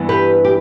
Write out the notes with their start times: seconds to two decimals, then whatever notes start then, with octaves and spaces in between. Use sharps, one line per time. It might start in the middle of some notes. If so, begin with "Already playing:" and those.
Already playing: G2 E3 B3
0.09 G4 B4
0.45 G4